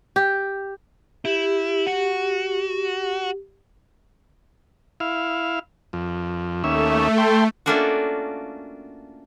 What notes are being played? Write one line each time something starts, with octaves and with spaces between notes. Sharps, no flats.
G4
E4 G4
F#4
E4 F5
F2
D#2 A3 C#4 E5
A4 G5 C6
A3 A#3 C#4 D4 F4 F#4